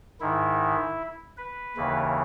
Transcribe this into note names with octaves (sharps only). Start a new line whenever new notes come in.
G#2 D#3 E4
B4
D#2 C#3 E3